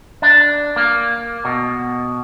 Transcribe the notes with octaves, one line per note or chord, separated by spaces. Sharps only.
D4
A#3
B2